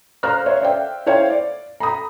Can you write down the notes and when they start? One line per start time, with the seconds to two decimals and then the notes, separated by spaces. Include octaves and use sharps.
0.23 C5 F5 A#5 F6 F#6
0.46 C5 C#5 E5 F5
0.62 C5 D5 E5 F5 G5
1.06 E4 C5 C#5 F5 G5
1.30 D5
1.80 A#5 B5 D#6